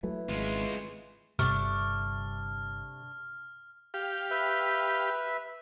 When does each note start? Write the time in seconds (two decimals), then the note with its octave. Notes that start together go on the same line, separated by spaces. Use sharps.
0.03 E3 F#3 A3
0.29 G#1 G#3 F4
1.39 G1 G2 C3 A3 D4 F6
3.94 G4 F5
4.31 B4 E5